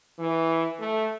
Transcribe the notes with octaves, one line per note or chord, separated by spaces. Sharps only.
E3
A3